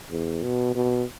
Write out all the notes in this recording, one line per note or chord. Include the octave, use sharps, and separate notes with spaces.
E2
B2
B2